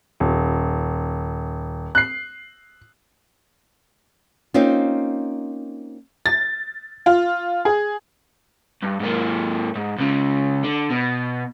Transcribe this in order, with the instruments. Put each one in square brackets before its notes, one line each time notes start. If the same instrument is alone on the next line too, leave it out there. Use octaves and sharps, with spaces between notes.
[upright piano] D#1
F#6 C7
[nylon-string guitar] A#3 C4 C#4 D#4 F4
[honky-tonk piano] A6
F4
G#4
[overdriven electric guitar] G2
G#2 A#3
G#2
C#2 C#3
D3
B2